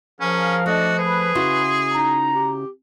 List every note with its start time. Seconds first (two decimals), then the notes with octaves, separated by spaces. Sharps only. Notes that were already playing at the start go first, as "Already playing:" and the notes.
0.21 F3 C#4 G#4 A#4 F5
0.66 A3 D4 F#4 D#5
0.99 G#4 B4
1.35 C#3 E4 F#4 C6
1.93 D#4 A#5
2.35 G4